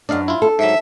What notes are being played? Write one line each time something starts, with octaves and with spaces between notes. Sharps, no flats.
F#2 D4 D5 D#5 F5
E4 F4
A4
G#2 F#3 E5